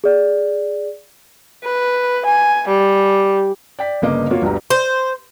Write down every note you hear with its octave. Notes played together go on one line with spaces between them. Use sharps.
G#4 D5
B4
G#5
G3
D5 G5 B6
G1 C#3 A#3 D#5 D6
A#3 F4 F#4 C#5
G1 D2 G3 A#5
C5